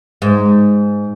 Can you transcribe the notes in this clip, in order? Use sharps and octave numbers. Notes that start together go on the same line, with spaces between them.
G#2